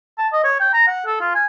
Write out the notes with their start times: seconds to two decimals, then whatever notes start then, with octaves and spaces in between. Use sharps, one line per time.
0.18 A5
0.33 D#5
0.44 C#5
0.60 G5
0.74 A#5
0.87 F#5
1.06 A4
1.20 F4
1.35 G#5